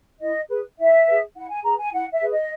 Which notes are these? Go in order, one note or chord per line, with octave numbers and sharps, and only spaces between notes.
E4 D#5
G#4 B4
E4 E5
G#4 B4
E4 F#5
G#5
G#4 B4 A#5
G#5
E4 F#5
E5
G#4 B4
D#5